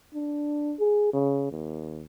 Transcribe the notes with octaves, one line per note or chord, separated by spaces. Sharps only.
D4
G#4
C#3
D#2